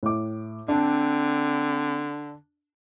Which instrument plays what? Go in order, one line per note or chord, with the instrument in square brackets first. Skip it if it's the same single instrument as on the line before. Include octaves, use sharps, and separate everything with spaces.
[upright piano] A2 D6
[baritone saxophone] D3 [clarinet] C4 [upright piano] D4